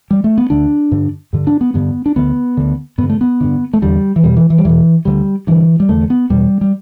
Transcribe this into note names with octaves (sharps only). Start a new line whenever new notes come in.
G3
A3
B3
D2 D3 D4
G2 D3
G2 D3
D4
B3
G2 D3 B3
D4
D2 D3 B3
D2 D3
G2 D3 B3
A3
B3
G2 D3
A3
E2 D3 G3
E3
E2 B2 G3
E3
E3
G3
E2 B2 E3
D2 D3 G3
G2 D3 E3
G3
E2 D3 A3
B3
E2 B2 G3
G3